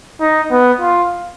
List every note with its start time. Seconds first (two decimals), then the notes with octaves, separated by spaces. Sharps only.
0.20 D#4
0.51 B3
0.81 F4